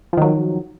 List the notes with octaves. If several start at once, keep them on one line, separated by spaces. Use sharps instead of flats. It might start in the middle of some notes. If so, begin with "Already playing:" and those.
D#3 F3 F#3